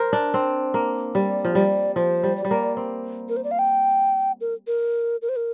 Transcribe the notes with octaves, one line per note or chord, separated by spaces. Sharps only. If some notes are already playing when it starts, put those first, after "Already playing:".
Already playing: A#4 C5
D4
C4
A#3
G3 D5
F3
G3 D5
F3 C5
G3
D5
G3
A#3
C4
A#4
C5
D5
F5
G5
A#4
A#4
A#4
C5
A#4